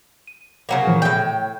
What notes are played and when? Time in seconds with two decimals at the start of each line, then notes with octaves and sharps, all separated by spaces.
0.27 D#7
0.69 C#3 F#3 A#3
0.87 A#2 E3 F3
1.02 A2 G5